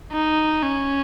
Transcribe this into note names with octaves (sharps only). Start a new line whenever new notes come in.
D#4
C#4